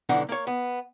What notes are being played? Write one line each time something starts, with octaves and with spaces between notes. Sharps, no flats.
B1 D3 E3 D#4 F#5
A#3 C#5
B3